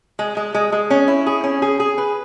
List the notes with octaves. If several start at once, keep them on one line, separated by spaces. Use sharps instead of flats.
G#3
G#3
G#3
G#3
C#4
E4
G#4
C#4
G#4
G#4
B4